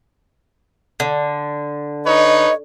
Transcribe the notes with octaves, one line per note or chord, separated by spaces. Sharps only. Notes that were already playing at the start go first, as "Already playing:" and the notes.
D3
D#4 B4 C#5 D#5